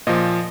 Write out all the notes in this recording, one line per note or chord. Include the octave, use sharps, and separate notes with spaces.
A#2 F3 D#5